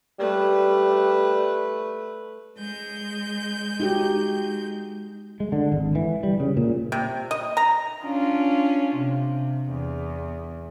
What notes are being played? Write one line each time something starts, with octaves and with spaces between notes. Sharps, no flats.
G3 A3 B4
G#3 G6
D#4 F#4 G4
G#3
D3
G#1
E3
G3
C#3
A#2
C3
D#5
A#5
C#4 D4 F4
C3
E2